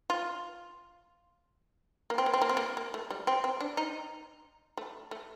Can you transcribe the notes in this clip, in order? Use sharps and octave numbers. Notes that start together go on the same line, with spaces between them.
F4
A#3
C4
A#3
C4
A#3
C4
A#3
A#3
A3
G3
C4
C4
D4
D#4
A3
A3